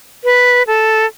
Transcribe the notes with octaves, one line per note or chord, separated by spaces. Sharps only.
B4
A4